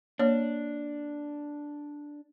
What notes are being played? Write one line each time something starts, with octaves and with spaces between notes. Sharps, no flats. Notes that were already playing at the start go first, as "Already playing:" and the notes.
A#3 D4 C#5